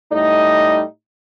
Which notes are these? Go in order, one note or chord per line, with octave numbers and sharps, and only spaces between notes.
A2 G3 A3 D#4 D#5